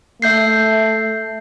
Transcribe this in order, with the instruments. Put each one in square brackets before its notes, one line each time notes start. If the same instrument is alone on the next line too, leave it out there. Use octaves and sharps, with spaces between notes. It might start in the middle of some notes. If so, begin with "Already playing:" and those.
[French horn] A3 [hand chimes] E5 G6 C7